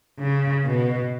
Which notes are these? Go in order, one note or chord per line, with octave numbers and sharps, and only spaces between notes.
C#3
B2